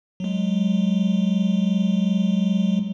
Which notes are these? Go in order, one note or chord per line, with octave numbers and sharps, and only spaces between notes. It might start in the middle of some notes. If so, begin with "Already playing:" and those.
F#3 G#3